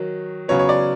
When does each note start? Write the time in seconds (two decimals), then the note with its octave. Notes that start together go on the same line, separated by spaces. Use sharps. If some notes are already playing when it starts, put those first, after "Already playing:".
Already playing: D#3 F#3
0.48 C#3 F#3 B3 C#5
0.59 C#5
0.69 D5